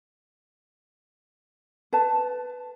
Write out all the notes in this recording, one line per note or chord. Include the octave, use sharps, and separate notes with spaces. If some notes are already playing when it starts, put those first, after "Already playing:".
B4 A5